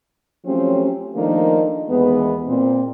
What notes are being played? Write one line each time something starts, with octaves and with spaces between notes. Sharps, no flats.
F3 F#3 A3 C4 C#4 G4
D#3 F3 A3 A#3 D4 D#4
D#2 E3 G#3 B3
A#2 C4